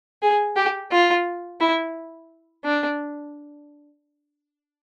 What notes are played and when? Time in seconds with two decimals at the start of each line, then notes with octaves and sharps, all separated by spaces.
0.22 G#4
0.56 G4
0.91 F4
1.61 E4
2.64 D4